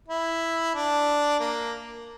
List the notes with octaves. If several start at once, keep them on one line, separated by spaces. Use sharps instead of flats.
E4
D4
A#3